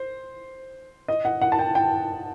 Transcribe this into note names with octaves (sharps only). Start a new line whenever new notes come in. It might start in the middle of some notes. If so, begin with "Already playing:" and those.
Already playing: C5
D#5
F#5
F#5
A5
G5
G5